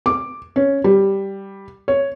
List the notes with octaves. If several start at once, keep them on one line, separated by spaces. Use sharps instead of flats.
D6
C#4
G3
C#5